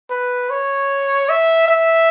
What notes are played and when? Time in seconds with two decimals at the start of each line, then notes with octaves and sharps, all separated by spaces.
0.10 B4
0.50 C#5
1.29 E5
1.68 E5